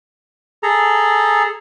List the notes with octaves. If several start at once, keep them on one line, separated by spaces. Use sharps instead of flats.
G#4 A4 A#5